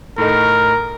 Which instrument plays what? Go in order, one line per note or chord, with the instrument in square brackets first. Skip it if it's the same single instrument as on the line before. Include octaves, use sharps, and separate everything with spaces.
[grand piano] A2 A3 D#4 [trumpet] A#4